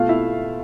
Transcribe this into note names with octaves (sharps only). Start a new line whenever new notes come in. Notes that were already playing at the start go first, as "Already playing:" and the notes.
Already playing: B2 A3 F4 F5
E4 E5